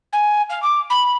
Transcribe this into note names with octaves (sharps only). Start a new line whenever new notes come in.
G#5
F5
D6
B5